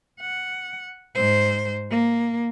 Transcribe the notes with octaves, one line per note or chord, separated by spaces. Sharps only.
F#5
G#2 C5
A#3